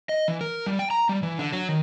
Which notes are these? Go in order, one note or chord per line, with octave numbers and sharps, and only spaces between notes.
D#5
E3
A#4
G3
G5
A#5
G3
E3
D3
F#3
D#3